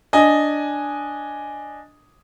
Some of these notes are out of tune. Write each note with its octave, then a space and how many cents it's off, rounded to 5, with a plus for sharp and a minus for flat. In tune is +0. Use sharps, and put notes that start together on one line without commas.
D4 +0 D#5 +0 G#5 +0